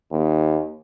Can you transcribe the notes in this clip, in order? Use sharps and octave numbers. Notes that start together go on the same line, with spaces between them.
D#2